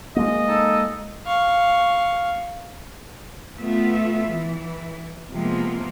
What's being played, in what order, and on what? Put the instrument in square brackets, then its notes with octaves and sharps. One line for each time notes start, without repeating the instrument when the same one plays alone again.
[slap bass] G#3 A#3 [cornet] D#5
[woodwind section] D#4 A4
[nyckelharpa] F5 C#6
[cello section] A3 B3 F4 E5
E3
C3 F3 G#3 A#3 B3